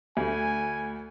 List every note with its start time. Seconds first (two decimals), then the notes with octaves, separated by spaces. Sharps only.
0.17 D2 G#5